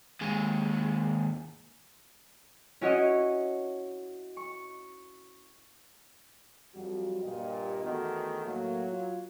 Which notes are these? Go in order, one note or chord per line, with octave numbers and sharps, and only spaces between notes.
D#2 G#3
C#4 E4 F#4 C#5 D#5
C#6
F2 F#3 G3 F#4
G2 A#2 G4 D#5
E2 D#3 A3 B3 F#4
A2 F#3 A#3
F4